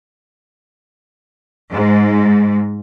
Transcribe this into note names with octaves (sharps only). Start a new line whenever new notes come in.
G#2